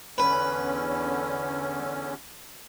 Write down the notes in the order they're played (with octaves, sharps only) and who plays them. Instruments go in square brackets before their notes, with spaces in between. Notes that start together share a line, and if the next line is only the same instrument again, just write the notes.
[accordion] E2 D3 C#4 [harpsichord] B4